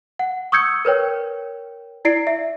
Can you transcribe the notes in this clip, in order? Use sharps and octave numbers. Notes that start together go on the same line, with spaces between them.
F#5
C#6 D#6 E6 G6 G#6 C#7
A#4 B4 C#5 G5
E4 D5 C7 D7
E5